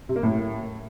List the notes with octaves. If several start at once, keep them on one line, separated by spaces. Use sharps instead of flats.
C3
A#3
A2